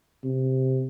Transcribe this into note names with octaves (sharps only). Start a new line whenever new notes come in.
C3